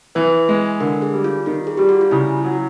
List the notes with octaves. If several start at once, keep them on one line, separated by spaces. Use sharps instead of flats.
E3 B4
G#3
D3 A#4
G#4
G3
F4
D#3 F4
G#4
G3 G4
F#4
F4
C#3 E4
F#3